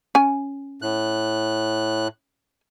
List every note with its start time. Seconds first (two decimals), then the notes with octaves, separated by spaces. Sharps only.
0.15 C#4 G#5
0.82 A2 F#6